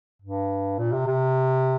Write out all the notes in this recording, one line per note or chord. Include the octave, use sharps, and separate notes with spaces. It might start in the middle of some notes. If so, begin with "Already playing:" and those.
G2
A#2
C3
C3